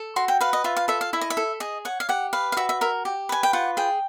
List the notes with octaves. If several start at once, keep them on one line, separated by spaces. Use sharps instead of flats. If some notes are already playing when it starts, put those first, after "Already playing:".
Already playing: A4
F#4 C6
G5
B4 F5
D#5
F4 E5
F5
A4 E5
F5
E4 E5
D#5
E5
A4
G#4 D#5
C#5 F#5
F5
G4 F#5
B4 F5
F5
F#4 E5
E5
A#4 E5
G4
B4 G#5
G5
F4 F#5
G#4 G5